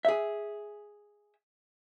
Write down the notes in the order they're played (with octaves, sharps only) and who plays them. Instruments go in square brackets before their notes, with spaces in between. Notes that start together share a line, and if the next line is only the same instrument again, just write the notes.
[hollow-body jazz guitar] G#4 E5